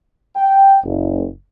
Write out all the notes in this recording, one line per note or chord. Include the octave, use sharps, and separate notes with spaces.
G5
F#1